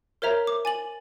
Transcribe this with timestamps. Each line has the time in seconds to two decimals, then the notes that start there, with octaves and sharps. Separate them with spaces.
0.22 A#4 C5 C#5 E5 A#5
0.47 D6
0.65 G#5 A6 F#7